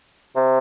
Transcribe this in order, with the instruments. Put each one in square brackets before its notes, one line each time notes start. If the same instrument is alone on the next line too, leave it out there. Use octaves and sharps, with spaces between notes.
[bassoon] C3